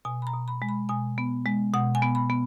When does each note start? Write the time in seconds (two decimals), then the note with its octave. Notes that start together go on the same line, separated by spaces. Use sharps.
0.05 B2 G#5
0.22 B5
0.27 A#5
0.33 B2
0.48 B5
0.62 G#3
0.69 B5
0.89 B2 G#5
1.18 B3
1.46 G#3
1.74 B2 F#5
1.95 G#5
2.02 B3
2.15 B5
2.30 B3